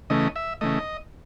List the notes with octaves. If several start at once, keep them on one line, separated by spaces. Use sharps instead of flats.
C#3 E3 A3 D#5
E5
C#3 E3 A3 D#5